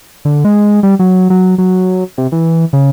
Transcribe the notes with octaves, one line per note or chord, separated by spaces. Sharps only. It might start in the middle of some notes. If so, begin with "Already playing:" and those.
D3
G#3
G3
F#3
F#3
F#3
C3
E3
C#3